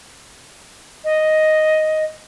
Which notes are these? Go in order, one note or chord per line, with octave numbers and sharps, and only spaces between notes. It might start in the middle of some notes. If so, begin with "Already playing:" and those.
D#5